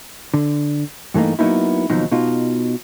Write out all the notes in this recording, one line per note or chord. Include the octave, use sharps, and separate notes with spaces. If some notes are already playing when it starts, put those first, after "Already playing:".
D3
G2 E3 A3 A#3 D#4
F#3 A#3 B3 C#4 D#4 E4
D#2 B2 F3 F#3 D#4
B2 D#4 F4